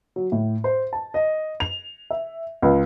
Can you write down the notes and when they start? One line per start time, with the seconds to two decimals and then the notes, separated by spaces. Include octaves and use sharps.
0.16 F#3
0.32 A2
0.64 C5
0.93 A5
1.14 D#5
1.60 F7
2.10 E5
2.62 C#2